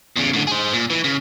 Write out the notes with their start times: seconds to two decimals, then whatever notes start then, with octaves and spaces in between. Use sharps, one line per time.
0.16 E2 C#3
0.34 A2 D3
0.47 G#4 C5
0.73 A#2
0.90 E3
1.04 C#3